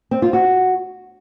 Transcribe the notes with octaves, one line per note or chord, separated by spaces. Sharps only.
C4
F4
F#4